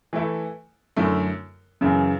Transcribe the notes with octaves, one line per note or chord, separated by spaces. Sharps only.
E3 A3 E4 A4
F#2 D3 A3 E4
F#2 C#3 E3